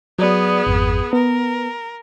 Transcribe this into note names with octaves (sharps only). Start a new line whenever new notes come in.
F#3 B3 G#4 D5
G#1 F2
B3 A#4